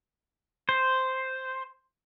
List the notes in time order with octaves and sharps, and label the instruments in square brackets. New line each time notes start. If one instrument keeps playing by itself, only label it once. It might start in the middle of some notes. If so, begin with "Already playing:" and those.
[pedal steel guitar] C5